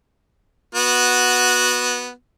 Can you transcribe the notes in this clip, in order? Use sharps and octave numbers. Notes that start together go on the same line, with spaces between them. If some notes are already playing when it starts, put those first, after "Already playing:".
B3 F#4